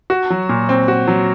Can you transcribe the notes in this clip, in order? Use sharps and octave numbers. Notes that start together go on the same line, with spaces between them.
F#4
F#3
A#2
C4
F#4
F#3